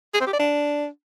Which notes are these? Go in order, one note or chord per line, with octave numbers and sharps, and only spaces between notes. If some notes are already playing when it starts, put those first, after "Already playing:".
G#4
C4
G4
D5
D4